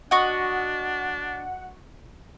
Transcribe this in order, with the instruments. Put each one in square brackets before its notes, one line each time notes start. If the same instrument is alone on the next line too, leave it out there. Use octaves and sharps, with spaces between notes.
[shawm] D4 [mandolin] F#4 D#5 [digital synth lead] F#5